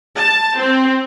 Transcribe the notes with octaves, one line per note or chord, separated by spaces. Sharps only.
A5
C4